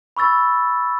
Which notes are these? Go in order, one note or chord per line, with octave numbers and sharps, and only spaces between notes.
B5 C#6 E6 A6